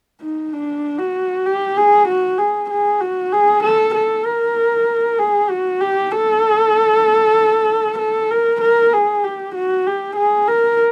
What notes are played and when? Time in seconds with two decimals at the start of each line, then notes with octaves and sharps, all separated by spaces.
0.22 D#4
0.53 D4
0.99 F#4
1.46 G4
1.77 G#4
2.08 F#4
2.38 G#4
2.70 G#4
3.01 F#4
3.33 G#4
3.63 A4
3.95 A4
4.25 A#4
5.19 G#4
5.50 F#4
5.81 G4
6.12 A4
7.98 A4
8.30 A#4
8.61 A#4
8.93 G#4
9.24 G4
9.55 F#4
9.86 G4
10.16 G#4
10.48 A#4